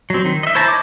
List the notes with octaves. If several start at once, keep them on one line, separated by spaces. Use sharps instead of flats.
F#3 C4
D#3
D#5 E5
E4 C5 C#5 A5 A#5
D#5 D6